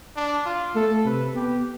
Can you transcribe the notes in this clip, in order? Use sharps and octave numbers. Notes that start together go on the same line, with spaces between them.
D4
F4
A3 A4
C3 B4
B3 G4